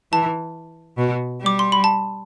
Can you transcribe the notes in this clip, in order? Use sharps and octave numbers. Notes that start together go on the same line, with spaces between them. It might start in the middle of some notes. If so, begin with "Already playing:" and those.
E3 A5
B2
G3
D6
C6
B5
A5